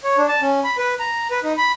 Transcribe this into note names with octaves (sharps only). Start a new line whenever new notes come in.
C#5
D4
A5
C#4
B5
B4
A#5
B4
D#4
B5